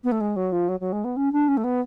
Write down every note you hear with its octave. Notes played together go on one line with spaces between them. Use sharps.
B3
A3
G#3
F#3
F3
F#3
F#3
G#3
B3
C#4
D4
C#4
A3
B3